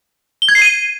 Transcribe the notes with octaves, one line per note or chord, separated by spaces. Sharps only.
G7
G#6
C7
D#7